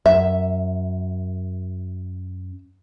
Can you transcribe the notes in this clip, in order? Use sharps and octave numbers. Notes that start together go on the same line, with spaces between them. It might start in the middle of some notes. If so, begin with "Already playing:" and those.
F#2 E5